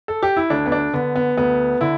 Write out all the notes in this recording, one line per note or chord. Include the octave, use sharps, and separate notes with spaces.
A4
G4
E4
D2 D4
B3
D4
D3 B3
B3
D2 B3
D3 E4